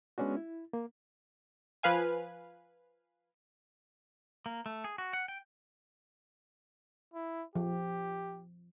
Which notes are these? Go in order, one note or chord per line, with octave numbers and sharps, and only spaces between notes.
G#3 B3 C#4 D4 F#4
E4
A#3
F3 B4 F5 G#5
A#3
A3
G#4
F#4
F#5
G5
E4
F3 G4